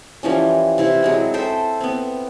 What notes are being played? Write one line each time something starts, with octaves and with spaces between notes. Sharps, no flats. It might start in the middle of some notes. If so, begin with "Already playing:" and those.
E3 F3 G3 C#4
C3 C4 E4
F#3 G#3 C4
A4 C5 E5 G5
B3 C4